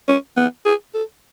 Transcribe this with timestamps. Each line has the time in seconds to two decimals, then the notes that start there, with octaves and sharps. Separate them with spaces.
0.08 C#4
0.37 B3
0.65 G#4
0.94 A4